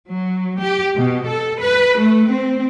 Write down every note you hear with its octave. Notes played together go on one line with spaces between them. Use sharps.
F#3
G4
B2
A4
B4
A3
C4